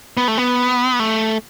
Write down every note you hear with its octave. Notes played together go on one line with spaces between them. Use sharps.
B3
A3
B3
A3